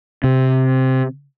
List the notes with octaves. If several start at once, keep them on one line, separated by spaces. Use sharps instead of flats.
C3